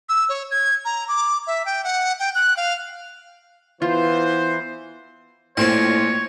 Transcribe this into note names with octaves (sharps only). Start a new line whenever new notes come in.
E6
C#5
G#6
A#5
D6
E5
G5
F#5
G5
F#6
F5
E3 B3 F4 C5
A#1 A2 A#3 C4 C5 C#5 F#5